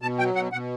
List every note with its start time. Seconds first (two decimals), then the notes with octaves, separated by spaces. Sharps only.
0.02 B2 A5
0.19 F#3 G5
0.36 B2 F#5
0.52 B2 F#5